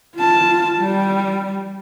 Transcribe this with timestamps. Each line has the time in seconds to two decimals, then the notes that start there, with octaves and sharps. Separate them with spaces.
0.17 F4 A5
0.78 G3